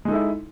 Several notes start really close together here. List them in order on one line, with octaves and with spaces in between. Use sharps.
G#3 D#4 A4 E4